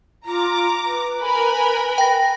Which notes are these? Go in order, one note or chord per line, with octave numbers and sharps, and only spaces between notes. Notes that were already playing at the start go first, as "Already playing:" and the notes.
F4 A#5 D6
B4
A#4 G#5 B5
G5 A#6